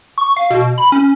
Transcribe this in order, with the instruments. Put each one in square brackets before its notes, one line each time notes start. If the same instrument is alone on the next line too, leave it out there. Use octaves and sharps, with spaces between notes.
[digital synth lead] C#6
F5
B2
B5
C#4